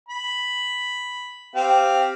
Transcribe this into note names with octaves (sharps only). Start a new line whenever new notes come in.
B5
C4 G4 F5